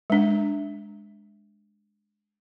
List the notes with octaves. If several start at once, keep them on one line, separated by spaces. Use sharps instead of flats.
G#3 D4